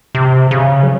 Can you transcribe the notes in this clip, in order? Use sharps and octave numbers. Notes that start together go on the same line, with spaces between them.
C3
C#3
F#3